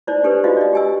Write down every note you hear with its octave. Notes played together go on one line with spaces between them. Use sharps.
D#4 E4 C5 D5
D4 G4 A4 B4 C5
D#4 F4 F#4 D#5 F5
D5 D#5
G4 G#5 E6